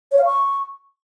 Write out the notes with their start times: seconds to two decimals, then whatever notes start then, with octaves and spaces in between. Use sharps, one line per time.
0.11 C#5
0.18 F5
0.25 C#6